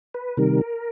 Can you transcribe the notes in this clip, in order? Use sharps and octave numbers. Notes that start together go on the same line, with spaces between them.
B4
C3 D#3 G3 A#4